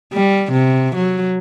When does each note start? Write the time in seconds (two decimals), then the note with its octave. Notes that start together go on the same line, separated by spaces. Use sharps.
0.13 G3
0.53 C3
0.96 F#3